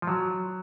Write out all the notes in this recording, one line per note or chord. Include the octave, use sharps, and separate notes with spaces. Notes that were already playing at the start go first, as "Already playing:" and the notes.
F3
F#3